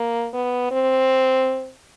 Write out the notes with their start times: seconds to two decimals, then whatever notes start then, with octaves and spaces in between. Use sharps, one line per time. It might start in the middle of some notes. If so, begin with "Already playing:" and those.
Already playing: A#3
0.34 B3
0.71 C4